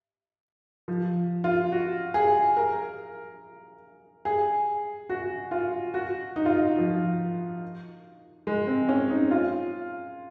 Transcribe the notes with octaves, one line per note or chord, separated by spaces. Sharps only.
F3
F4
F#4
G#4
A#4
G#4
F#4
F4
F#4
D#4
F4
D#4
F3
G#3
C4
C#4
D#4
F4